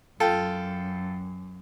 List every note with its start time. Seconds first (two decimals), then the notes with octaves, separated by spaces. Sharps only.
0.20 F#2 F4 A4 G5